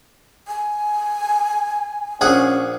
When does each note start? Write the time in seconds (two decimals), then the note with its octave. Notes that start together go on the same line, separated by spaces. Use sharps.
0.48 G#5
2.21 A#1 C#4 G#4 F#5